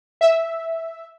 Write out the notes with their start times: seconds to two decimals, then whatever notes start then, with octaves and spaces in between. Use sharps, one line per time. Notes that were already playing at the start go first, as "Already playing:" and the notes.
0.21 E5